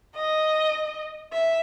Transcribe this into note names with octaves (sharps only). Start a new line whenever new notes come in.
D#5
E5